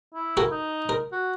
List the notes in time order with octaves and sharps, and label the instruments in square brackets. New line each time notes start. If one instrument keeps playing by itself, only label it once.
[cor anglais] E4
[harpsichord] F#4 A4 A#4
[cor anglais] D#4
[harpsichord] A#4
[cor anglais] F#4